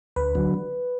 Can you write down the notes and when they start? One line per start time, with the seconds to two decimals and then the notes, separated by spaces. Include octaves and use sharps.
0.16 D2 B4
0.35 D3 F#3